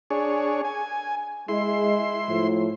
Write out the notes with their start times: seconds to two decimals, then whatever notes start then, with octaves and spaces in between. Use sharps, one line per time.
0.10 D4 G#4 C#5
0.65 G#5
1.48 G#3 E4 C6
2.29 A2 F3